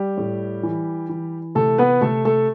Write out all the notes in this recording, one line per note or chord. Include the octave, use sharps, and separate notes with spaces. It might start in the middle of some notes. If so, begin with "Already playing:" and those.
Already playing: G3 G4
A2
E3
E3
C3 A3 A4
B3 B4
C3 A3 A4
A3 A4